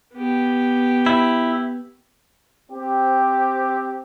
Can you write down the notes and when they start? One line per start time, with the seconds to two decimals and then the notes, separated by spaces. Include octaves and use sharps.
0.14 B3 G4
1.06 E4
2.72 C4 G4